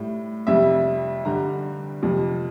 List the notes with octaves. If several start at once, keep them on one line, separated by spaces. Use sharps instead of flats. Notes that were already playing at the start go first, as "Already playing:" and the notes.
Already playing: A2 G3
F2 C3 G3 E5
G2 D3 G3 A#5
F2 C3 F3